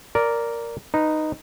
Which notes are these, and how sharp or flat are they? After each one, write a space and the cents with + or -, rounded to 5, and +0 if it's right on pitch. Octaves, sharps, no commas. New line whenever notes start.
A#4 +0 D5 -10
D#4 -5 B4 +0